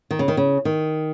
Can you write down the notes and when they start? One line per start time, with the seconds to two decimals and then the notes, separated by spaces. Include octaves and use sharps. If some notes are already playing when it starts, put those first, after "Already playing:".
0.11 D#3
0.19 C#3
0.28 D#3
0.37 C#3
0.65 D#3